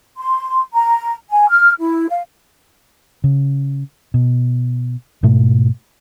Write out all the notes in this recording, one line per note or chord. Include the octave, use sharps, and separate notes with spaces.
C6
A#5
G#5
F6
E4
F5
C#3
B2
G#2 B2 A3